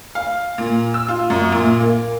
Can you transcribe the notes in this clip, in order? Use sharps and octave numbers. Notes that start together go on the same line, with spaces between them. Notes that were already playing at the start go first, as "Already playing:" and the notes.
F5
A#2
E6
F4
F#2
A#2
A#3